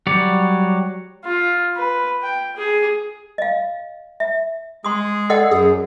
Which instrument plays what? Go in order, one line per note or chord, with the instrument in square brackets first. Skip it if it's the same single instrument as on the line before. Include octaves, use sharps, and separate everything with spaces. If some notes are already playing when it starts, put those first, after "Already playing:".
[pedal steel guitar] F#3 G3 C#5 D5
[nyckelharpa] F4
B4
G5
G#4
[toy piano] D#5 F5
E5
[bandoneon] G#3 G#4 [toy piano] C6 D#6
[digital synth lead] A4 [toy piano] D5 D#5 F#5
[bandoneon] F#2 [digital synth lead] G#4